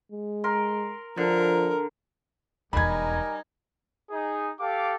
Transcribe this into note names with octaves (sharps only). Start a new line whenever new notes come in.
G#3
A#4 C6
D3 F3 A#4
E1 E2 G3 D#4 A#4 G#5 B5 G#6
D#4 G#4
G4 A4 F5 D6